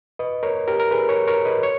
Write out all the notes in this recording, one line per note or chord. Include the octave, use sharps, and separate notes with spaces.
B4 D#5
A#4 C#5
G4 A#4
A#4
G#4 B4
A#4 C#5
A#4 C#5
B4 D#5
C#5